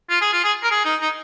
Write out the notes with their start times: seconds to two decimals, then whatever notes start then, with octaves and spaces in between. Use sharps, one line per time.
0.10 F4
0.21 G#4
0.33 F4
0.44 G#4
0.63 A#4
0.71 G#4
0.85 D#4
1.01 D#4